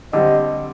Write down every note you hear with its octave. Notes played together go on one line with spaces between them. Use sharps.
D3 G3 C4 D#5